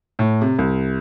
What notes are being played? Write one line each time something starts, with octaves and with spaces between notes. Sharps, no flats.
A2
C3
C2